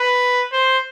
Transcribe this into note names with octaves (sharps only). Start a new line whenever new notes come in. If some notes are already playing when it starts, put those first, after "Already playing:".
Already playing: B4
C5